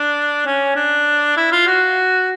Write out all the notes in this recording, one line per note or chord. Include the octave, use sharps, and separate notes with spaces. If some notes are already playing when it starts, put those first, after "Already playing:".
Already playing: D4
C#4
D4
E4
F4
F#4